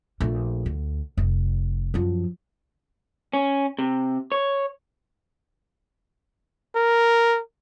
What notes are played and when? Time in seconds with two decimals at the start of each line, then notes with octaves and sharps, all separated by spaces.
0.20 A#1 A3
0.66 D2
1.17 F1
1.94 F#2 F3
3.33 C#4
3.79 C3
4.32 C#5
6.75 A#4